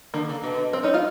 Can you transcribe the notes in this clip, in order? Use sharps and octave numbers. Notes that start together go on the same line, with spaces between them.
D3 A#3
C#3
B2
C4
C#4 D#4
D#4 F4